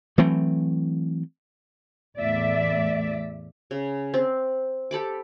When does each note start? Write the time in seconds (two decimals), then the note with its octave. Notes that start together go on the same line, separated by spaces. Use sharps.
0.18 E3 F#3 A3 C4
2.18 E2 A2 D5 E5
3.71 C#3
4.14 C4
4.91 G4 A4 B5 D6